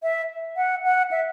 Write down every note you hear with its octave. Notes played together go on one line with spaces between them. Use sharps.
E5
F#5
F#5
E5